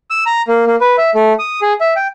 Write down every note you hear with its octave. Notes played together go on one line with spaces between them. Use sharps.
E6
A#5
A#3
A#3
B4
E5
A3
D#6
G#4
E5
G5